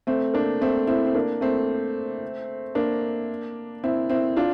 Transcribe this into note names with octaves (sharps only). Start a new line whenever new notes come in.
A3 C4
A#3 D4
A3 C4
C4 E4
C4
A#3 D4
A3 C4
A#3 D4
C4 E4
C4 E4
D4 F4